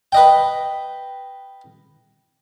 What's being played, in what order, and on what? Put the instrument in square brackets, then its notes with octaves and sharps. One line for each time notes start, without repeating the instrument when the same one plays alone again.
[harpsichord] B4 D#5 G5